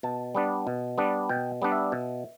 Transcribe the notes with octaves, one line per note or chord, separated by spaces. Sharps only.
B2 A5
G3 B3 D4
B2
G3 B3 D4
B2 G5
G3 B3 D4
E5
B2